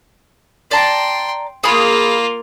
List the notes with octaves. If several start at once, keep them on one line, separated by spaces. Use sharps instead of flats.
D5 G5 A5 A#5 C6
A#3 F4 G#4 B5 D#6